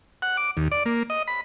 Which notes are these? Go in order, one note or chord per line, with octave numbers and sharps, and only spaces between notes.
F#5
D6
D#2
D5
A#3
D#5
B5